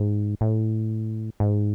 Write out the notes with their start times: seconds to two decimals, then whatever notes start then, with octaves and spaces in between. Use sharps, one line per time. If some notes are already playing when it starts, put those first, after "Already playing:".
Already playing: G#2
0.41 A2
1.40 G#2